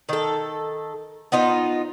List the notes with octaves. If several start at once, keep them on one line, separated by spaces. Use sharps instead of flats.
D#3 A4
B3 D#4 F4 C5